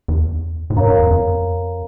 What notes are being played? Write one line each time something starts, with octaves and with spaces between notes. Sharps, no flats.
E2
A2
G2 A#4 C#5 F5 A#5
G2
F2
F2